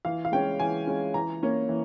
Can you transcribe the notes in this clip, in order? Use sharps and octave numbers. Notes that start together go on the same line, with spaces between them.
E3 F5
F5
G#3 C#4 G5
E3 G#5
G#3 C#4
E3 A#5
A#3 C#4
E3